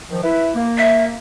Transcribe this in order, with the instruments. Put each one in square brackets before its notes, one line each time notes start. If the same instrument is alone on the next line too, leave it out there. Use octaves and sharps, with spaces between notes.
[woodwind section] D#3 F3
E4 B4
A#3
[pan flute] E5